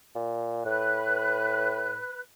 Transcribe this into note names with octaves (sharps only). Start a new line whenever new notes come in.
A#2
A2 B4 F#6